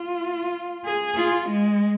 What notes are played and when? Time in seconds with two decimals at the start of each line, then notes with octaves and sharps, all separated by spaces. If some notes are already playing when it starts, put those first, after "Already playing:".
Already playing: F4
0.86 G#4
1.17 F4
1.49 G#3